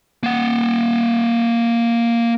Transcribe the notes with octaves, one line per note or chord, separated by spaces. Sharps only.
A#3 F#5